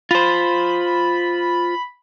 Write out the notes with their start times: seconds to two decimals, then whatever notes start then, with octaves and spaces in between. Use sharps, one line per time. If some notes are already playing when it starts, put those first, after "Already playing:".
0.11 F4 C5 B5